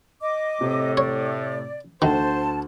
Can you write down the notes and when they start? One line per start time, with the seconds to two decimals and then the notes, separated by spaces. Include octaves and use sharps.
0.21 D#5 D6
0.61 A2 C3
0.97 C#5 D5
2.02 D2 D#3 A4 C5 F#5 A5